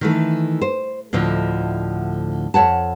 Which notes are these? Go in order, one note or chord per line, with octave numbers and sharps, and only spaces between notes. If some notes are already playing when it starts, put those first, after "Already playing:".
D#3 E3 A3
C5
D2 A2 D3 F3 D#5
F2 C#5 F#5 A5